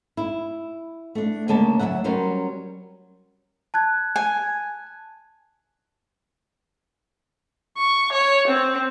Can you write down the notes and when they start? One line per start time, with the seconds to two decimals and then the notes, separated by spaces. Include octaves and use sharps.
0.17 E4
1.15 A3 D4
1.48 D2 C#3 G#3 A#3 C#5 A5
1.79 D2 G2 F#3 E5 F#5
2.04 F#3 G3 C#4 A#4 C5
3.74 A5 F#6 G#6
4.16 G#5
7.78 C#6
8.13 C#5
8.48 C4